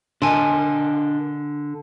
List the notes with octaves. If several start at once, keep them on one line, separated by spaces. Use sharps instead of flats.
D3 D4 A#4 D#5 G#5 A5 C6